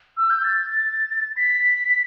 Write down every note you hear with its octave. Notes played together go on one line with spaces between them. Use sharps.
E6
G6
A6
B6